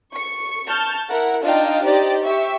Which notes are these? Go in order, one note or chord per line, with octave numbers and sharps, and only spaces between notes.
C#6 C#7
A5 C#6 F6 G6
E4 A#4 F#5
D4 D#4 F4 D#5 F5 G5
D#4 G4 C5 D5 D#5
G4 E5 C#6